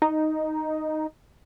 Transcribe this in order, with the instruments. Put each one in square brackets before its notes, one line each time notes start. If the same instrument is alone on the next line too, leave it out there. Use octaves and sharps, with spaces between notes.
[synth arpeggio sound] D#4